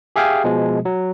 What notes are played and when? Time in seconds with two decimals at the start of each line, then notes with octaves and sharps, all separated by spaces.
0.16 G4 G#4 E5 F5 G5 G#5
0.44 B2 F3 G#3
0.85 F#3